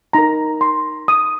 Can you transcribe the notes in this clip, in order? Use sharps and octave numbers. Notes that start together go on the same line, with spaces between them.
D#4 A#4 A#5
C6
D#6